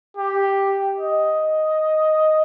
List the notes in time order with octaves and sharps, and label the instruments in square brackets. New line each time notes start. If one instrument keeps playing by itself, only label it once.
[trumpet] G4
D#5